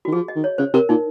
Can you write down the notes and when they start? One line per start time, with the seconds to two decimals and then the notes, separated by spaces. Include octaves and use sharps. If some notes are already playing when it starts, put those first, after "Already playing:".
0.05 F#4
0.08 D#3
0.13 F3 G#4
0.28 D#5
0.35 D#3
0.44 C#5
0.58 C#3 C5
0.74 C3 A#4
0.89 A#2 D#4